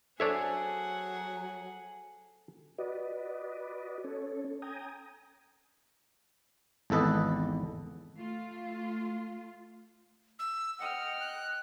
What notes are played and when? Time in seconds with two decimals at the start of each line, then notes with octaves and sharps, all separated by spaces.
0.20 F#3 D4 G#4 A4 C5 C#5 E5 F#5
2.78 F#4 B4 D5 D#5
4.04 C#4 A4 C#5
4.62 G5 G#5 A#5 D#6
6.90 G#1 E2 A4 B4 D#5
8.16 A3 F4
10.39 E6
10.79 D#5 F#5 G5 F6
11.20 F#6